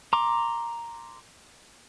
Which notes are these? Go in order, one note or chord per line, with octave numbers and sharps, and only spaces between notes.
A#5 C6 D6